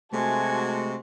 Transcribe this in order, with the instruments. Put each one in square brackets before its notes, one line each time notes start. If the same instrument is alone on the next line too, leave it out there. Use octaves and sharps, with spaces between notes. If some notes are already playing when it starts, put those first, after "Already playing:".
[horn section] C3 G#3 F#4 [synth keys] A3 [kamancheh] G#5 A5